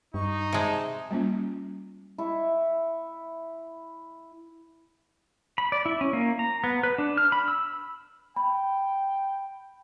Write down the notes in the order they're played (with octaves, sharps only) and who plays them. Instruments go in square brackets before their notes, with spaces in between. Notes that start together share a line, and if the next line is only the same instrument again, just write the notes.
[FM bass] G2 [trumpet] D#4 [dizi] C#6
[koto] C3 G#3 [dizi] A5
[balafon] G3 A#3 C#4 F4
[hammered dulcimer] E4 C#6
[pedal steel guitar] B5
D5
E4
C#4
A#3
A#5
B3
B4
D4
F6
B5
E6
[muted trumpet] G5 [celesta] B5